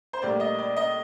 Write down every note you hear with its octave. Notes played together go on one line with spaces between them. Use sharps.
C5
A#1 A2 G3 A#3 D5
D#5
D5
D#5